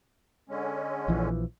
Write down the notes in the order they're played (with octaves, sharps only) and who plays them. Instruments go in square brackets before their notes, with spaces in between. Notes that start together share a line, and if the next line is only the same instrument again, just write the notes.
[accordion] D3 G#3 C#4
[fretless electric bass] A#1 E3 F3